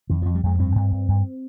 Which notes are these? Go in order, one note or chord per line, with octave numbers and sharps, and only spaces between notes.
F2 D#3
F2 F3
G3
F2 G#3
G2 C4
G2
G2
G2